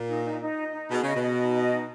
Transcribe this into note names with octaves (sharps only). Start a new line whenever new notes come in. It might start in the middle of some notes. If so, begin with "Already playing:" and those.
Already playing: A#2
D#4
D#4
D#4
D#5
D#4
B2 G#4
C#3 D#5
B2
D#5
D#4
D#5
D#4